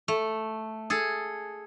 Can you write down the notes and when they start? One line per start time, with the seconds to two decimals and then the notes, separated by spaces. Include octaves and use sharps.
0.08 A3
0.90 G#4 A4